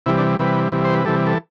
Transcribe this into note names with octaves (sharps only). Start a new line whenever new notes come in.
C3 E3 G3 E4
D4
C3 E3 G3 B4
C3 E3 G3
C5
B4
C3 E3 G3 A4
A4